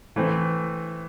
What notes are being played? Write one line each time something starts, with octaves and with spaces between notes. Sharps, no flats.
E3 A3 C4